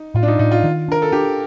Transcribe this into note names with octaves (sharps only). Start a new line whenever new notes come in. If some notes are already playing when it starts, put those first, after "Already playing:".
Already playing: D#4
A2 F4
D4
D#4
A2 D#4
F4
D#3
D4 A#4
A4
D4 G4